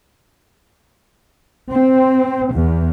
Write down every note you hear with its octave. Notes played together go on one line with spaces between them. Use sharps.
C4
E2